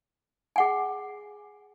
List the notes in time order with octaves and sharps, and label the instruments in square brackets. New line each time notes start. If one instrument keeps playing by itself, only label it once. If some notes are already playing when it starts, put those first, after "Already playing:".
[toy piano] G#4 F#5 G#5